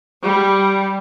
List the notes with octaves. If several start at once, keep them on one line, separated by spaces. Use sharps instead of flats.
G3